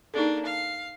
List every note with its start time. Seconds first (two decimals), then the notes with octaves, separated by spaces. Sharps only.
0.14 A#3 D4 D#4 G#4 A4
0.45 F5